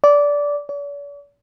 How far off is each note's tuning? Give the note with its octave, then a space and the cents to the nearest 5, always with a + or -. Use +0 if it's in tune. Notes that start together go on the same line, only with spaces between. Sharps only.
D5 -15
D5 -45